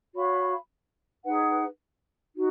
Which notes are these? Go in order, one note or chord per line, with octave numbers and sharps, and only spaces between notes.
F#4 C#5 F5 B5
D#4 G#4 B4 F#5
D#4 F#4